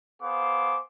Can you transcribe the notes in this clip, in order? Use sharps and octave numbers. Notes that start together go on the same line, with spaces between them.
B3 G#4 C5 F5 D6